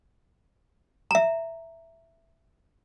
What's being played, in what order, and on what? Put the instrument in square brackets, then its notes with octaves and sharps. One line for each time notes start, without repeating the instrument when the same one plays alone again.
[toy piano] E5 A#5